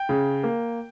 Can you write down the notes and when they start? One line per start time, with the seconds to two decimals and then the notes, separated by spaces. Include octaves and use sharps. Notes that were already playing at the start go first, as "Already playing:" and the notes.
Already playing: G5
0.09 C#3
0.43 A#3